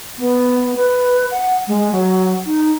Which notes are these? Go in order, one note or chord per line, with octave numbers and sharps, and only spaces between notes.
B3
B4
F#5
G#3
F#3
D#4